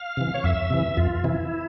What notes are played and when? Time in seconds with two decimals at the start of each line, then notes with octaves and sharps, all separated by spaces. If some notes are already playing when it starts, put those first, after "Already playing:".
Already playing: F5
0.17 C3 E3
0.34 C#5
0.44 F2 E5
0.70 C3 E3
0.97 F2 F4
1.24 C3 E3 E4